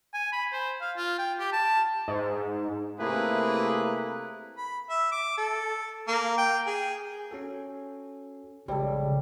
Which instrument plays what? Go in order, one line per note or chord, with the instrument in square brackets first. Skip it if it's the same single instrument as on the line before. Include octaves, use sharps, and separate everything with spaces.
[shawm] G#5
B5
C5
F5
F4
G5
G4
A5
[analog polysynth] G#2
[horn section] C3 A3 A#3 E4 G#4 B4
[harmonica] B5
E5
D6
A4
A#3
G5
G#4
[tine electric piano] C#4 F#4 A4
[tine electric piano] A#1 G#3 C#5 [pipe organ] C#3 [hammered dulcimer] G3 A4